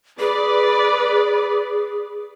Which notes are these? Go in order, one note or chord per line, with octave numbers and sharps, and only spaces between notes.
G#4 B4 D5